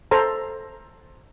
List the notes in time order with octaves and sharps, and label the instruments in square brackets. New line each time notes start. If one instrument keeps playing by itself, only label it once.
[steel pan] A4 C5 A#5